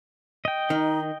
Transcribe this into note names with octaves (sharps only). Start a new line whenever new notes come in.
D#5 G5
D#3 D#4